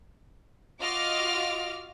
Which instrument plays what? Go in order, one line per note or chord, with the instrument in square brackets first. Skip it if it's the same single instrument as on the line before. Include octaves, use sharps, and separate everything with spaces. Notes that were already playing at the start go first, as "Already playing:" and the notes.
[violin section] F4 F#4 D#5 D6 F6